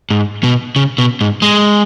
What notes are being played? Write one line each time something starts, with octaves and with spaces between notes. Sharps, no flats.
G#2
B2
C#3
B2
G#2
G#3